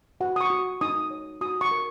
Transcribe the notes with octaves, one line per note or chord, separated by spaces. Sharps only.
F#4 F#5
D#6
C#6
F#4
D#4 D#6
C#5
F#4 D#6
C#6
A#4